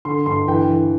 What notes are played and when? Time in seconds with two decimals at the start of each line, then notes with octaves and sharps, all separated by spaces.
0.05 D3 C6
0.26 G2 C6
0.48 E3 G5
0.69 E3